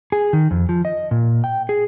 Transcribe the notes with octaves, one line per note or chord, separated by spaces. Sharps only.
G#4
D#3
F2
F3
D#5
A#2
G5
G#4